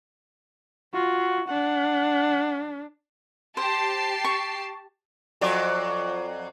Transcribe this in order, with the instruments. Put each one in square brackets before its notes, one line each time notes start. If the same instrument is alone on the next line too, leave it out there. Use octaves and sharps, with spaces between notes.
[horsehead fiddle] F4 [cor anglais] F#4
[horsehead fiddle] D4 [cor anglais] F#5
[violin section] G4 A5 C7 [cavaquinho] C5
[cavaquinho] C#6
[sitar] F2 F#3 D5